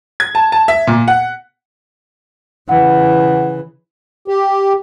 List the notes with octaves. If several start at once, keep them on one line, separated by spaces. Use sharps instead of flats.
G#6
A5
A5
E5
A#2
F#5
C#3 E3 F#5
G4